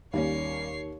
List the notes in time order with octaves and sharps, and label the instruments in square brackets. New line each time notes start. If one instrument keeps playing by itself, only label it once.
[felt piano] D#2 [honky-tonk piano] G3 A#3 C#4 [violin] C#5 C7